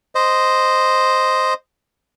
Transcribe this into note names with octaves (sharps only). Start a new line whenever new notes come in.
C5 D#5